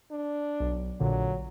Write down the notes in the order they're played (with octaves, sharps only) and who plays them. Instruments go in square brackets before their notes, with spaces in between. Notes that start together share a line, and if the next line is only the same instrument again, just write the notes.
[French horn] D4
[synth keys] B1
[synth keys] A#1 A#2 D3 [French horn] F#3